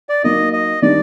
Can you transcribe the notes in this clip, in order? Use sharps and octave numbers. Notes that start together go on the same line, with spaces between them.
D5
F#3 A#3 D#4 D#5
D#5
D#3 G3 D4 D5